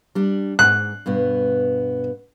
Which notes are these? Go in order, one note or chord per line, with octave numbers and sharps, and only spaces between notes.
G3 D4
G#2 F#6
G2 B2 B3